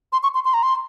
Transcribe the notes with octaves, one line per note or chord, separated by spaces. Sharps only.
C6
C#6
C6
C6
A#5
C6